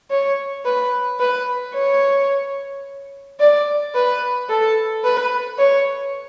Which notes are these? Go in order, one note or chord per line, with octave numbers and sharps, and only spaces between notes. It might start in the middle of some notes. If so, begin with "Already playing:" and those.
C#5
B4
B4
C#5
D5
B4
A4
B4
C#5